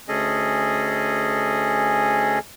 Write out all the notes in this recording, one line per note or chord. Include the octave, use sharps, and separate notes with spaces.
D2 C#4 G#4 A4 D#5